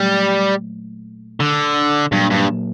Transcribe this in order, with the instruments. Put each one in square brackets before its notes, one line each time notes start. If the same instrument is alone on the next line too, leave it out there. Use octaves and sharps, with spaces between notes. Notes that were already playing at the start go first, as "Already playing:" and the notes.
Already playing: [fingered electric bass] A#2 F#3 A3 [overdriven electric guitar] G3
[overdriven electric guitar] D3
[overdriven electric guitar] G2 [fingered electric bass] A#2 F#3 A#3
[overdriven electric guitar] G2